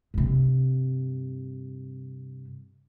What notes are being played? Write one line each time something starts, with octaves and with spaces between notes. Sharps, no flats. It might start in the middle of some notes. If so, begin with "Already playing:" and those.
G2 C3